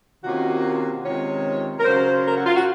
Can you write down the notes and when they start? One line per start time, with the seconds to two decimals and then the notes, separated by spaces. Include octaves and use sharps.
0.24 C3 D#3 A#3 C#4 F4 F#4
1.05 C3 D#3 G#3 C#4 F4 C#5
1.80 A#4
1.85 C#3 F#3 C#4 F4 C5
2.26 A#4
2.36 F#4
2.46 F4
2.56 F#4